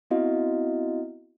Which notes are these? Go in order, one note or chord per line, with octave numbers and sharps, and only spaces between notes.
B3 C4 E4 F#4 D#5 F5